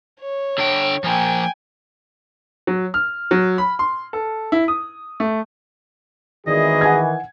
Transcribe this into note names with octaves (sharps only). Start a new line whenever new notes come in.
C#5
D3 D4 G5
F3 A#3 G5 G#5
F#3
F6
F#3
B5
C6
A4
E4
D#6
A3
G#1 E2 D#3 E3 G#4 D5 D#5
F#5 G#5 G#6